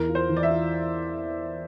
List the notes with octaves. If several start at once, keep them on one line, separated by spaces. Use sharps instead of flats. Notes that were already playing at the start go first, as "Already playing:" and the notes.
Already playing: E2 A#4
F4
C5
E3
D5
E5
F4